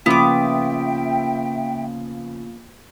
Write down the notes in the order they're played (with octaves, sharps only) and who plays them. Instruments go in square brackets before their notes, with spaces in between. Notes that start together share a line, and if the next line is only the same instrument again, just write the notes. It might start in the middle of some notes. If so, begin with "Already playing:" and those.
[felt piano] C#3 F3 [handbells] A#3 F4 [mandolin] B3 D6 [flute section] E5 G5